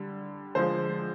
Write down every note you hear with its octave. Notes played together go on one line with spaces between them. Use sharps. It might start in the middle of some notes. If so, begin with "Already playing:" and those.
Already playing: D3 G3
D3 F3 G#3 C5